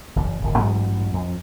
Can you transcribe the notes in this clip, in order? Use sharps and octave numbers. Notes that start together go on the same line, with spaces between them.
F#1 E2
D1 G1 D#3
A1 G2 F#3 B3
F2